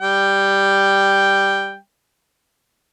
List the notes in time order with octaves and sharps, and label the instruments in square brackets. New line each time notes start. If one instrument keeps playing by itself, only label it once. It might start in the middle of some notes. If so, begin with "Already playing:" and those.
[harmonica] G3 G5